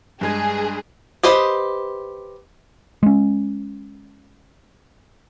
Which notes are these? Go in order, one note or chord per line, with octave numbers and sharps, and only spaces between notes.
G2 G#3 G#4 G#6
G4 B4 C5 D#5
G#3 C#4